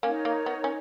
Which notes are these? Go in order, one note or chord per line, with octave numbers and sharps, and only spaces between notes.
A#3 C#4 D#4 A#4 C#5
A#3
B3
C#4